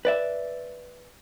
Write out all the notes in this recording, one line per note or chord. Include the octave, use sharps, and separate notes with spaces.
B4 D5 E5